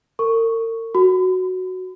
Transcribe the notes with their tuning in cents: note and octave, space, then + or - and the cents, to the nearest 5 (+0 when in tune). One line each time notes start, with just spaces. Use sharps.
A#4 -45 C#6 +0
F#4 +0 B5 +40